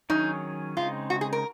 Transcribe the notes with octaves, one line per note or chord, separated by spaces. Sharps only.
D#3 F#3 C#4 D#4 G#4 C#5
C#3 G#3 C4 D#4 F4
F#4
G#4
A#4